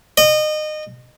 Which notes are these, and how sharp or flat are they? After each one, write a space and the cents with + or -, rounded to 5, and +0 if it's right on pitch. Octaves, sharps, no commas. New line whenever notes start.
D#5 -25